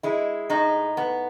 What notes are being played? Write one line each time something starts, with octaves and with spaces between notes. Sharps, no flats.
G#3 E4
A2 D#4
B3